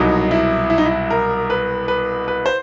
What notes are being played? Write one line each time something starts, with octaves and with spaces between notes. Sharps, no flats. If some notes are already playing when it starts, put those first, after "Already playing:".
Already playing: C2 B2 F#3 D#4
E4
E4
D#4
E4
A#4
B4
B4
B4
C5